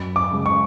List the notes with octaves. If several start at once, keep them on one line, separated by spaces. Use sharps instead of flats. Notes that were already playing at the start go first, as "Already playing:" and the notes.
Already playing: F#2 B5
D6
C#3 G#3
C#6